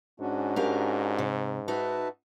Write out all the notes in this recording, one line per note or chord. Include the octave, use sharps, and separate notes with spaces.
G#2 C#4 D4 F#4
G4 A#4 F5
C3
D#4 F#4 B4 E5 A5